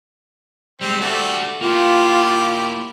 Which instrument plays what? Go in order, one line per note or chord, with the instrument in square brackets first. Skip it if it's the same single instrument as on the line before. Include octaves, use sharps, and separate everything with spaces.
[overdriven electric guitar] G3 G#3 [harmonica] C4
[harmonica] G3 A3 [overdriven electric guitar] F#4 A4
[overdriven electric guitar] A#3 E4 [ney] F4 [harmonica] G4